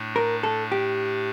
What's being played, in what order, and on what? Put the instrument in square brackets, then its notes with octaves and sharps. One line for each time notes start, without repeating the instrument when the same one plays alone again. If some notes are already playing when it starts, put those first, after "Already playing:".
Already playing: [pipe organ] A2 A3 D4
[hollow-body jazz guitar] A#4
A4
G4